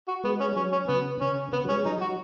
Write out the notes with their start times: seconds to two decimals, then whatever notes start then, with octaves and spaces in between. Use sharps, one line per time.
0.08 F#4
0.24 G#3 B3
0.40 C#4
0.56 F#3 C#4
0.72 C#4
0.88 C#3 B3
1.21 C#3 C#4
1.53 C#3 B3
1.65 F#3
1.69 G#3 C#4
1.85 F#3 D#4
2.01 F#3 F#4